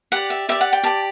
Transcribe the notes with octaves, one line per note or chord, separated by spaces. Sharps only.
G4 D5 F#5
E5
G4 D5 E5
F#5
G5
G4 D5 A5